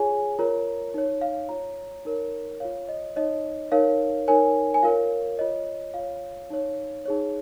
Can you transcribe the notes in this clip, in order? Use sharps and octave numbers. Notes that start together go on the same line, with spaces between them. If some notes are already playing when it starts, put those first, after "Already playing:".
Already playing: F4 G#4 C#5 G#5
F4 A#4 C#5 A#5
D#4 C#5
F5
F4 C#5 A#5
D#4 A#4 C#5
F4 C#5 F5
D#5
D#4 C#5 D#5
D#4 A#4 C#5 F5
D#4 A#4 C#5 G#5
G#5
F4 A#4 C#5 F5
F4 C#5 D#5
F4 C#5 F5
D#4 C#5
D#4 G#4 C#5